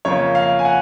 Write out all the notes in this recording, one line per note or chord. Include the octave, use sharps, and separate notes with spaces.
F2 C#3 F3 A#3 C#5
F5
G#5
F#5